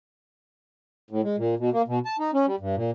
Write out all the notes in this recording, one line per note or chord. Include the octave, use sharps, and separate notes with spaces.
A2
G#3
A#2
B2
A#3
B2
A5
D#4
C#4
G3
G2
A#2